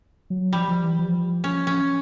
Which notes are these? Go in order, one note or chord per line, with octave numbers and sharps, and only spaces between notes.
F#3
F3 G3
F3
E3
F3
C#4
C#4